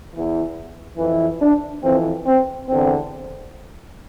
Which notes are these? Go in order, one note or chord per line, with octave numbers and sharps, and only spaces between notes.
E2 E3
F2 E3
D4
F2 E3 C4
C4
E2 D3 C4